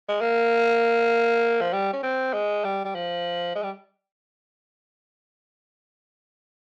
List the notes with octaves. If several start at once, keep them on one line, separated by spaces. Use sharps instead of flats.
G#3
A#3
F3
G3
C#4
C4
G#3
G3
G3
F3
G#3
G3